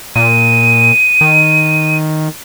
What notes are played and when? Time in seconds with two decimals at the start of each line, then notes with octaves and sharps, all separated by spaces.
0.16 A#2 D#7
1.21 D#3